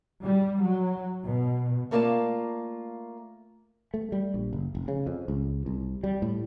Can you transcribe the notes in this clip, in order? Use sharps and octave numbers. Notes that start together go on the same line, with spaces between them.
G3
F#3
B2
A3 A#3 F4 A#4 D5 A5
A3
G3
A#1
F#1
F1
C#3
F2
C#2
C2
G3
A2